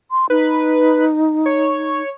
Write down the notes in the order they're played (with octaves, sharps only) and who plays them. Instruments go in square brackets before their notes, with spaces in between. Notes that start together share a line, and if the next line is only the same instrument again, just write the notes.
[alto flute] C6
[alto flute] D#4 [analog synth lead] B4
[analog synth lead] C#5